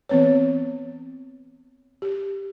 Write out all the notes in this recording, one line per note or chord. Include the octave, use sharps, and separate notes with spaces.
E3 B3 C4 B4 C#5
G4